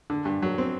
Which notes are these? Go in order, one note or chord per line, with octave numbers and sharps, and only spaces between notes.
D3
G2
F#3
C4